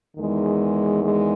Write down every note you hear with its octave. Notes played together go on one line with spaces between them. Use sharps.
E2 D#3 G#3
G#3